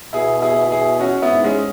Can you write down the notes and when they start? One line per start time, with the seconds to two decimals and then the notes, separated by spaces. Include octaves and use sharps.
0.13 B2 E4 G#4
0.42 E4 G#4
0.56 B2
0.72 E4 G#4
1.00 C#4 F#4
1.22 B3 E4
1.29 G#2
1.44 G#3 C#4